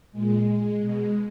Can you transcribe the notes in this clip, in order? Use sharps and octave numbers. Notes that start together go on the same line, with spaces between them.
A#2 G#3
B2 G#3